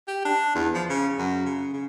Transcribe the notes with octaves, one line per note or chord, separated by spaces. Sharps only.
G4
D4
E2
F3
C#3
F#2
C#3
C#3